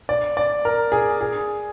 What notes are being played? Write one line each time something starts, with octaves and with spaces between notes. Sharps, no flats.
D5
D5
A#4
G#4
G#4